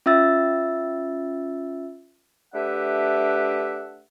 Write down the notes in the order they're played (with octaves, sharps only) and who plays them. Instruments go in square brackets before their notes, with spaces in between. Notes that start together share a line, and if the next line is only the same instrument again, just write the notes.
[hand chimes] C#4 F4 E5 E6 A6
[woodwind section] A3 D4 G4 B4 E5 F#5